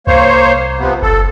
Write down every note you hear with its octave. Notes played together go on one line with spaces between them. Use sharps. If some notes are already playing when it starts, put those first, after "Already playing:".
C2 A#3 C5 C#5
C3 F3 B3
F#1 A4